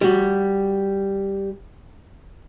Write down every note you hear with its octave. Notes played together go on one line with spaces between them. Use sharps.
G3 F#4